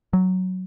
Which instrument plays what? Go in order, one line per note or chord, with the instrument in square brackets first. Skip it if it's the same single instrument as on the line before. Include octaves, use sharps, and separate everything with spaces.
[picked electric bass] F#3